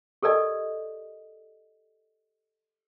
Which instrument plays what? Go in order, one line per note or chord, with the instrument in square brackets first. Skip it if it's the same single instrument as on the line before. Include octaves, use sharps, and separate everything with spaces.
[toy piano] G4 A4 A#4 D5 D#5